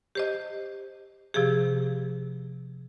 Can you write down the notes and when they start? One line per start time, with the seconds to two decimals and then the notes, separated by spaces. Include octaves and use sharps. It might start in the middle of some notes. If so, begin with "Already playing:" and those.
0.15 G4 C5 D#5
1.34 C3 F3 G4 G#4